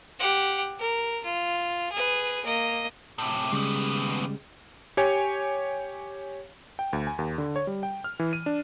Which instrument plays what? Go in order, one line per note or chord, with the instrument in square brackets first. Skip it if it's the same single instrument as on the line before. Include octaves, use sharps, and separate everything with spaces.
[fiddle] G4 F#5
A#4
F4
G#4 B4
A#3 D#5
[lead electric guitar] A2 C3
[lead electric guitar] D#2 B3 [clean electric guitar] C#3 G3 G#3
[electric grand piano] G4 C#5 G#5
G5
D2
G#5
D#2
D3
C#5
G3
G5
F6
E3
D#7
D4